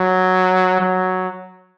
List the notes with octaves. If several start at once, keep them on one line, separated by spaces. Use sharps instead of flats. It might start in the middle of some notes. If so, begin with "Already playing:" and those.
Already playing: F#3
F#3